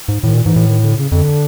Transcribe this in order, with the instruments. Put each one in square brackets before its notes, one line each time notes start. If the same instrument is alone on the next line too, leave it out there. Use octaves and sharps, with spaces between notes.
[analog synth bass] G#2
[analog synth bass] A2 [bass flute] D#3
[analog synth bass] A#2
[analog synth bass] G#2 [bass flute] E3
[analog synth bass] A2
[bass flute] D#3
D3
C#3
[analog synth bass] F2 [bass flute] D3